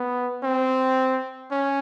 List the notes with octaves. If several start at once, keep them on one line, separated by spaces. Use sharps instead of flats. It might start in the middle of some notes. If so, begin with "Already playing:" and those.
Already playing: B3
C4
C#4